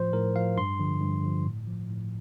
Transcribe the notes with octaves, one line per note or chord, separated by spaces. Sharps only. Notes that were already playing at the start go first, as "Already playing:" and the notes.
Already playing: A2 F3 C5
A2 A#4
F3 F5
G2 C6
D3 F3
G2
D3 F3
A2
F3
A2